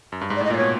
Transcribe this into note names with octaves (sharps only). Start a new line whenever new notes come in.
F#2
G2
G#2
D5
A2 D#5
A#2 D5
B2 C#5